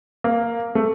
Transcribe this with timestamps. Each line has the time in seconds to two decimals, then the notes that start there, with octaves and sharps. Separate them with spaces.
0.24 A#3
0.75 A3